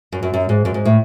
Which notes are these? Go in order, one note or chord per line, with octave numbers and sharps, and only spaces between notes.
F#2
F#2
F#2
G#2
F#2
G#2
A2